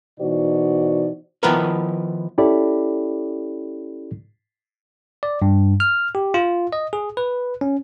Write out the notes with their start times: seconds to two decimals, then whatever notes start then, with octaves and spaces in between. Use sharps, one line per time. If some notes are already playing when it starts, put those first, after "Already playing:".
0.20 B2 E3 D#4 F#4 C5 D5
1.43 D#3 F3 B3 E4 A#4 B4
2.38 C#4 E4 G4 A4 D5 B5
5.23 D5
5.42 G2
5.80 F6
6.15 G4
6.34 F4
6.73 D#5
6.93 G#4
7.17 B4
7.61 C#4